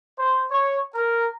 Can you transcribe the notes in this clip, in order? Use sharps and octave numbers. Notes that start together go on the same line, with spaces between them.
C5
C#5
A#4